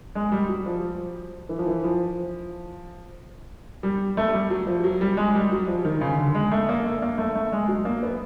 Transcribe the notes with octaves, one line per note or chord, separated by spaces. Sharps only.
G#3
G3
F#3
F3
E3
F3
E3
F3
G3
A3
G3
F#3
F3
F#3
G3
G#3
G3
F#3
F3
D#3
C#3
D3
G#3
A3
A#3
A3
A#3
A3
A3
G#3
F#3
A#3
B3